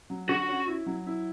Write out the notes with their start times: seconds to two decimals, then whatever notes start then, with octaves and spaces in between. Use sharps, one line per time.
0.10 F#3
0.29 D3 F#4
0.49 C#4
0.67 E4
0.86 F#3
1.07 E4